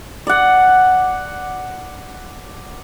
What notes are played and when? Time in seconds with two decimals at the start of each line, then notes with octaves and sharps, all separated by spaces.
0.27 D5 F#5